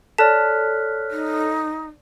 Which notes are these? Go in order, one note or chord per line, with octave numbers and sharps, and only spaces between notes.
A4 C#5 D5 A5 F6 F#6 B6
D#4